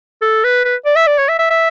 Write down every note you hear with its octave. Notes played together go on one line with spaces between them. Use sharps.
A4
B4
B4
D5
E5
D5
C#5
E5
E5
E5